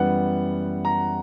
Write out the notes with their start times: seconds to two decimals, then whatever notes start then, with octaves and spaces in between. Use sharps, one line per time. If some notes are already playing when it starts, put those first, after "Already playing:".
Already playing: F#2 E3 G3 B3 F#5
0.85 A#5